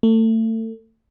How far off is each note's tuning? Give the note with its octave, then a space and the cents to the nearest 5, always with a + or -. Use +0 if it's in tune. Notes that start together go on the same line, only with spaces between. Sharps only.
A3 +30